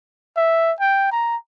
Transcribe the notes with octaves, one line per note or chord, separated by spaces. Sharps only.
E5
G5
A#5